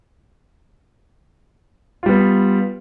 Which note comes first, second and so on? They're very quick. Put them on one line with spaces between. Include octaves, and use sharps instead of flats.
F4 G3 B3